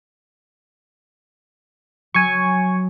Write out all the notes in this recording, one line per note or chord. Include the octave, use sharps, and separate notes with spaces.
F#3 G#5 C#6